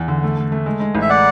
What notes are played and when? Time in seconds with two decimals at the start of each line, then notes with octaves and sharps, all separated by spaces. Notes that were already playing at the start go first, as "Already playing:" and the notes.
Already playing: E2
0.08 D3
0.23 A3
0.37 A3
0.52 A3
0.66 G#3
0.80 G#3
0.95 A1
1.02 E5
1.10 D5 F#5